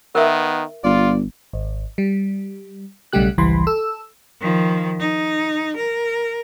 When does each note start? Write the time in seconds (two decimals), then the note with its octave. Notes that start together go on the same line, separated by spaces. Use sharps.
0.15 D#3 B3 A#4 E5
0.84 G1 F4 D5
1.53 G#1
1.98 G3
3.13 B1 C#3 G3 A3 G4 F#6
3.38 G#1 C#2 E3 G3 B5 C6
3.67 A4 E6
4.41 D#3 F3
4.99 D#4
5.77 A#4